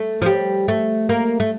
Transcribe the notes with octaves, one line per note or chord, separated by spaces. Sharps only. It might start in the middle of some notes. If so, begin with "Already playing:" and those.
Already playing: A3
F3
G3
A3
A#3
A3